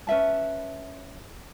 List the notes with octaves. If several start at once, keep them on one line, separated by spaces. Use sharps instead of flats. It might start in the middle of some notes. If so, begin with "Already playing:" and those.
C#4 B4 E5 A5